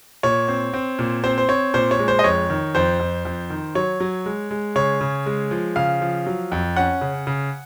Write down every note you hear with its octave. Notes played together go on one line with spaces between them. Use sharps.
A#2 C#5
C4
C4
A#2
C4 C5
C5
C4 C#5
A#2 C5
C#5
G#3
C5
D#5
F2 C#5
D#3
F2 C5
F2
F2
D#3
F#3 C#5
F#3
G#3
G#3
C#3 C#5
C#3
G#3
F3
C#3 F5
F3
F#3
F2
C#4 F#5
C#3
C#3